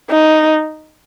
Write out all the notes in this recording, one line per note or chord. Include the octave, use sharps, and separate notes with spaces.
D#4